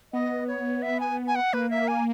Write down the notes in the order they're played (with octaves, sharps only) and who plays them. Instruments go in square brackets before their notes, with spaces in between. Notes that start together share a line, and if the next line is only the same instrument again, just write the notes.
[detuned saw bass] B3 [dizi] D#5
[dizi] C#5
E5
G#5
G#5
F#5
[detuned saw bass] A#3 [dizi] B4
[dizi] E5
G#5